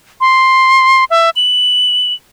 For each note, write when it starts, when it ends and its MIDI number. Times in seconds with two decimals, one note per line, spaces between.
0.21 1.04 84
1.10 1.30 76
1.36 2.13 102